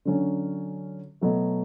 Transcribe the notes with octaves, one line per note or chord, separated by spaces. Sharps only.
D3 F#3 C#4
B2 F#3 A3